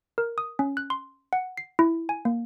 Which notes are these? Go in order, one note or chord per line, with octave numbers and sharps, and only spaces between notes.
A#4
D#6
C#4
F#6
C6
F#5
C7
E4
G#5
A#3